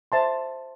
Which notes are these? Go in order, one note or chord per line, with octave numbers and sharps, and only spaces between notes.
C5 E5 A5 C6